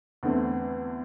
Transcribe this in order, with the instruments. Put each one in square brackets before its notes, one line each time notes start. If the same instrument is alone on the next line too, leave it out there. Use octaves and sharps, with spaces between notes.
[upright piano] E2 D3 A3 C4